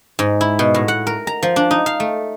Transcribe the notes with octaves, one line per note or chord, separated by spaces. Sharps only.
G#2
E4
B2
A2
F#5
A#4
A#5
F3
D4
D#4
F5
A3